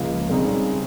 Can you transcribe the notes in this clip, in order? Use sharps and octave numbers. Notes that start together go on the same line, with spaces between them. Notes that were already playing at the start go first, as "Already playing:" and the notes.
Already playing: C#2 C#3 F3 A#3
C#3 G3 C4 D#4